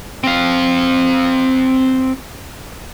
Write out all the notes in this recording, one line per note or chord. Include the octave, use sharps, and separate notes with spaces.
C4 F5